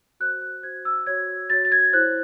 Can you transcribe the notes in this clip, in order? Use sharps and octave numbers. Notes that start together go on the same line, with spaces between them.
F#4 C5 F#6
F#6
F#4 C5 G#6
E6
F#4 C#5 G#6
F#4 C#5 A6
A6
G#6
E4 C5 F#6